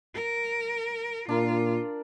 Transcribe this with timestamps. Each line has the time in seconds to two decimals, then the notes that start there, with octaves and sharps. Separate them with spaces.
0.14 A#4
1.29 A#2 D4 F4 A#4